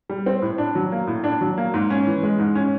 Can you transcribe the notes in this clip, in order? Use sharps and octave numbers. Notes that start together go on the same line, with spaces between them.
G3
C4
A2
D4
F#3
A#3
A2
D4
F#3
A#3
G#2
C#4
E3
G#3
G#2
C#4